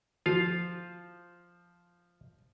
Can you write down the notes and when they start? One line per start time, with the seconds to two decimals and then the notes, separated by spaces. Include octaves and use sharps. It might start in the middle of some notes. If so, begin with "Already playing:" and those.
0.26 F3 F4 F5